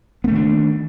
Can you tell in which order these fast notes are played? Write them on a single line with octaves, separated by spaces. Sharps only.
B3 A3 D#3 D4